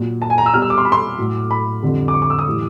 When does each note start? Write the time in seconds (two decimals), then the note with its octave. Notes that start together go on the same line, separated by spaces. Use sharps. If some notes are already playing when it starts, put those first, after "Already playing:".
Already playing: A#2 F#3
0.22 A5
0.30 G#5
0.38 A#5
0.46 E6
0.53 B2 G3 F6
0.62 E6
0.70 D6
0.78 C6
0.85 B5
0.92 C6
1.18 A2 F#3
1.51 B5
1.83 F2 D3 G3
2.08 D6
2.14 C#6
2.22 D6
2.30 E6
2.39 D#6
2.47 A2 E3 G3